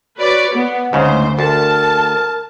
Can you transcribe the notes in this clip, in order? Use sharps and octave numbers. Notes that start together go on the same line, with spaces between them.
F#4 B4 C#5 D5
B3 F#5
D2 G#2 C#3 C5
D2 A#4 A5